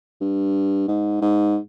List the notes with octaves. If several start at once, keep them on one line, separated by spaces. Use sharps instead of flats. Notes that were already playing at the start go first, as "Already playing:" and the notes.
G2
G#2
G#2